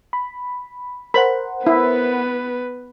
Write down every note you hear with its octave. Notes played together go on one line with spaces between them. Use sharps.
B5
A#4 C5 F#5 B5
B3 E4 B4